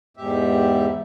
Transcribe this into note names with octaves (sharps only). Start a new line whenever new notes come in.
E2 G#2 G4 E5